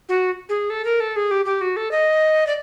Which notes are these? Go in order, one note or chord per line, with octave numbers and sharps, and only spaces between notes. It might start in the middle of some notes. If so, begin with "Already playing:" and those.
F#4
G#4
A4
A#4
A4
G#4
G4
G4
F#4
A4
D#5
D5